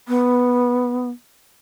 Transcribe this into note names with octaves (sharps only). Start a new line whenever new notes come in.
B3